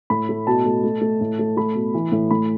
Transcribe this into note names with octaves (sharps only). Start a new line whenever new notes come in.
A2 B5
A3
B2 A5
A3
A3
A3
A2
A3
A3 B5
B2
E3
A2
A2 B5